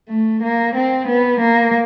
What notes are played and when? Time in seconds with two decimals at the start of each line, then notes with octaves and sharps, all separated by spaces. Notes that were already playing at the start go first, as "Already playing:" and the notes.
0.09 A3
0.43 A#3
0.75 C4
1.07 B3
1.40 A#3